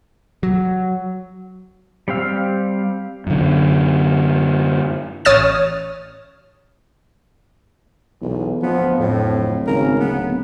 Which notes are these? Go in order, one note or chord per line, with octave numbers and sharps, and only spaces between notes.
F#3
G3 C4 G4 F5 E6
F#2 D3
A1 C#5 D#6 F6 A6 E7
B1 E2
D1 F3 B3
F2 A2
G#1 C#3 A#4
D1 B3